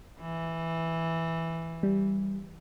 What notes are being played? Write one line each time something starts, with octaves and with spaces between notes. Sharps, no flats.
E3
G3